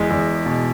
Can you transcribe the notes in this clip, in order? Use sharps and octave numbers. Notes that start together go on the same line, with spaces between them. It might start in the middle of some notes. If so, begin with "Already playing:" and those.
Already playing: E2 G#3
E2
B2